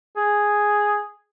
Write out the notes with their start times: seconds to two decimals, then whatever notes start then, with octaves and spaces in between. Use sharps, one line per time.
0.17 G#4